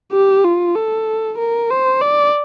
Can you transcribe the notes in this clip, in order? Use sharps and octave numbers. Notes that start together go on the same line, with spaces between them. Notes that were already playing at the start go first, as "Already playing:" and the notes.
G4
F4
A4
A#4
C5
D5